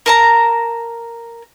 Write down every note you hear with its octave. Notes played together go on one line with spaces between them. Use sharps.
A#4 A5 A#5